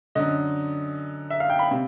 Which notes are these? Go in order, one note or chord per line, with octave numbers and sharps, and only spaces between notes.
F#2 D3 D#5
E5
F5
G5
B5
C3